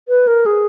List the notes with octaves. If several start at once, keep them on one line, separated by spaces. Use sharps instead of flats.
B4
A#4
G#4